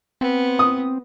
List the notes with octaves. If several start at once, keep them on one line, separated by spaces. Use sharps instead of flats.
B3 C4
D#6